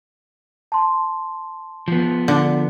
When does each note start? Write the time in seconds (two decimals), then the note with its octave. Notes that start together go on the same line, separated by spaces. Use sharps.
0.72 A5 C6
1.88 F3 B3
2.28 D3